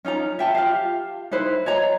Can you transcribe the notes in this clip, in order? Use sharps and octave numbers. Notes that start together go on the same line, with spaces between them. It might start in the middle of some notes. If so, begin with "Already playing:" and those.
C#4 D#4 F4 A#5
E5 G5 A5
F4 G4 F5
D#4 E4 B4 C5
C#5 D#5 A#5